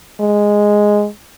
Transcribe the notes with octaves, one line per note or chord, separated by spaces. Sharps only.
G#3